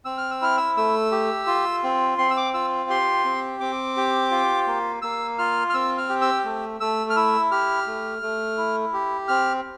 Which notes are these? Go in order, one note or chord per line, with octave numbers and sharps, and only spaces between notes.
C4 E6
F6
E6
E4 F6
E6
A3 E6
G4
F4
C4
C4 C6
E6
D6
F4 E6
G4 C6
C4
C4 D6
G4
F4
A#3
A#3 E6
F4 F6
F6
C4 E6
F6
G4
E6
A3
A3 E6
F6
E4 E6
G4 F6
A3
A3
E4
G4
C4 F6